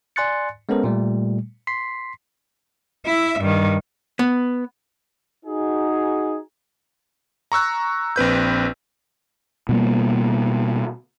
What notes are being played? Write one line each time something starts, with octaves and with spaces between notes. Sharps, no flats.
D5 G#5 C6 F#6 A6 C#7
G#3 B3 C#4 A4 A#4 C5
A#2 G3 A3
C6 B6 C7
E4 E5
G2 D#3
B3
D#4 F#4 G#4
A#5 C#6 E6 F#6
A#1 C4 B4 G6
B2 G3 A#3